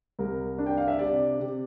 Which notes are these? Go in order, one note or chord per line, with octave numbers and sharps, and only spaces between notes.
C2 A#4
D4
G5
F5
E5
C3 D5
C3